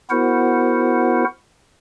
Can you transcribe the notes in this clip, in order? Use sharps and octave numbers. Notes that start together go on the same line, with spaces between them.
B3 E4 F#4 A#4 C5 F#5